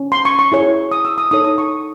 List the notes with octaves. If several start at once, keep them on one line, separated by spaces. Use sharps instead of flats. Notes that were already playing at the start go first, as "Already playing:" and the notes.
Already playing: C#4
C6
C#6
C#6
E4 G#4 C#5
D#6
E6
D#6
D#4 A4 C#5 D#6
D#6
C#6